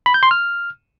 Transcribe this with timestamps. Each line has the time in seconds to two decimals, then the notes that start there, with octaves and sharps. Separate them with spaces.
0.06 B5
0.14 G6
0.23 C6
0.31 F6